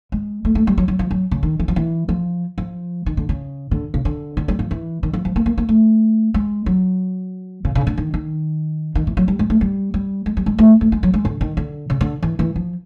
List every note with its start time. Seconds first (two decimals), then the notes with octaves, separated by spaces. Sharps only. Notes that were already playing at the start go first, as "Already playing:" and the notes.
0.12 G#3
0.45 A3
0.55 A3
0.67 G3
0.78 F#3
0.88 F#3
0.99 F3
1.11 F#3
1.31 C#3
1.43 D#3
1.60 E3
1.68 F3
1.76 E3
2.09 F3
2.58 F3
3.06 D#3
3.17 D3
3.29 C#3
3.71 D3
3.94 C#3
4.05 D3
4.37 D3
4.48 G3
4.59 F3
4.71 E3
5.03 D#3
5.13 F3
5.25 F3
5.36 A#3
5.46 A#3
5.58 A#3
5.69 A3
6.34 G#3
6.66 F#3
7.65 C#3
7.75 C#3
7.87 D3
7.98 D#3
8.14 D#3
8.95 D#3
9.07 E3
9.17 F#3
9.28 G3
9.39 G#3
9.50 A3
9.61 G3
9.94 G3
10.26 G#3
10.37 G3
10.46 G#3
10.58 A3
10.81 A3
10.92 G#3
11.03 F#3
11.14 G#3
11.25 D3
11.41 D#3
11.57 D3
11.90 C#3
12.01 D3
12.23 E3
12.39 E3
12.56 F3